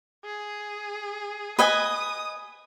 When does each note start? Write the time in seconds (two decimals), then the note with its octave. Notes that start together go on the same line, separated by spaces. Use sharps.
0.25 G#4
1.59 B4 D#5 G#5 D#6